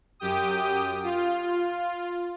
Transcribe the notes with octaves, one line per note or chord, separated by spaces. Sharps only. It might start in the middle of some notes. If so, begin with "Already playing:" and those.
F#2 G4 G5 D#6
F4